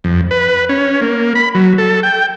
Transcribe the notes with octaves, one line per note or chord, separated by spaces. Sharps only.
F2
B4
C#4
A#3
B5
F#3
A4
G5